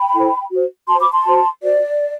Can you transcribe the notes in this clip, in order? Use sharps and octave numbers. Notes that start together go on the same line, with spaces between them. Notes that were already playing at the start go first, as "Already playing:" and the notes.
Already playing: G5 B5
E4 A4 C5
F#4 C5
F#4 C5 A5 C6
B5 D6
A5 C6
F#4 C5
F#4 C5 D5